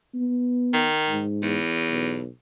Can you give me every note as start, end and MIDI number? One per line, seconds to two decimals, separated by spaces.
0.15 0.89 59
0.74 1.24 51
1.09 1.58 44
1.42 2.22 40
1.90 2.27 35